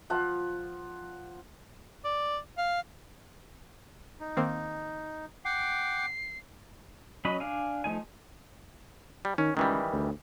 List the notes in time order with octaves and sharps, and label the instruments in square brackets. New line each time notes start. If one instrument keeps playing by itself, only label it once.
[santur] F3 F#5
[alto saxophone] D5
F5
[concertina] D#4
[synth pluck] D#3 A#3 C4
[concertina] F#5 G5 D6 [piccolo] C7
[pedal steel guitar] F#3 C#4 D#5 B5
D4 F5 G#5
F3 A3 D#4 G#5
[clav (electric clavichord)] G3
[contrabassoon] D#3 [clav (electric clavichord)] C#4
[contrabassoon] C#2 [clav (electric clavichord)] D#3 E3 G3
[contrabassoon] D2